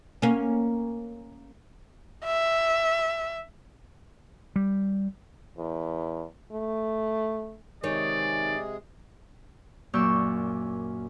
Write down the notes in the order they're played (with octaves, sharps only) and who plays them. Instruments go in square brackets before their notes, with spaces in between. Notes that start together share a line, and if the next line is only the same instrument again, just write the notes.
[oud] A#3 C#4
[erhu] E5
[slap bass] G3
[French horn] E2
A3
[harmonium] C3 G#3 G#4 [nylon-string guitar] D#3 D#4 C#5 [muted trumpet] D5
[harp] F#2 A#2 D5 C#6 E6 G6